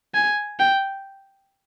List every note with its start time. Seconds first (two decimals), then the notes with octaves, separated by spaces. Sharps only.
0.14 G#5
0.60 G5